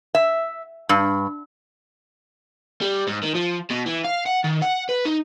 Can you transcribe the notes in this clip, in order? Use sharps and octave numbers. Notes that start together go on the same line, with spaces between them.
E5
G2
G3
G#2
D#3
F3
B2
E3
F5
F#5
D#3
F#5
B4
D#4